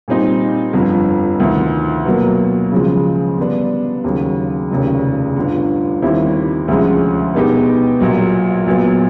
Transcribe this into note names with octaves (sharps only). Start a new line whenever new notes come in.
A#2 G3 C4 D#4
G1 F2 D3
D2 C3 D#3
B2 F#3 A#3
C#3 F3 G#3
D3 G3 B3 D4
D#2 C#3 F#3
F1 D#2 C#3
G1 G2 D3
D#2 D#3 G3 C4 E4
D2 C3 F3 G#3 C#4
B2 G#3 B3 D#4 G4
A#1 A#2 F#3
A#1 A#2 F#3 B3